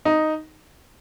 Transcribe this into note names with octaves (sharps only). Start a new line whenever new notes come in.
D#4